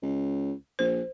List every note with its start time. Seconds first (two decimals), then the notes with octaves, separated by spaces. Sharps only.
0.02 C#2
0.79 A#1 C5